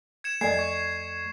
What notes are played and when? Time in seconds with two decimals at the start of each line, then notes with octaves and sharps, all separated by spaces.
0.24 G#6 C#7 E7
0.41 F2 A3 D5 D#5 G#5 G#6 C7
0.54 C#6 G#6